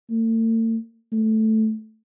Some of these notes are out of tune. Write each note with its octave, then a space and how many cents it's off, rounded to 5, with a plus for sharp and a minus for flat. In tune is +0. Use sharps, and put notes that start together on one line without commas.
A3 +45
A3 -5